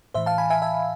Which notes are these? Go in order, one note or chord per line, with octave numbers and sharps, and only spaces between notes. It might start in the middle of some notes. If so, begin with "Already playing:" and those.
A2 E3 C5 E5
F5 A5
G#5 B5
E5 G#5
E5 G#5